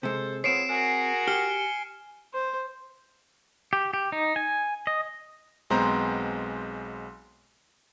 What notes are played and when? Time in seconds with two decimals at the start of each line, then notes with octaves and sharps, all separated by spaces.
0.03 C3 G#3 A4 C5
0.44 B3 C4 F4 G#4 C#5 C7 D7 E7
0.69 F#4 G#4 A#4 G#5
1.27 G4 F6 C#7 G7
2.33 C5
3.73 G4
3.94 G4
4.12 D#4
4.36 G#5
4.87 D#5
5.70 B1 G#3 B3 C4 C5 A#5